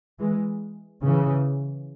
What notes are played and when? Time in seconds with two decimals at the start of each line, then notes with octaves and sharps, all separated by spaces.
0.19 E3 G#3
1.03 C#3 E3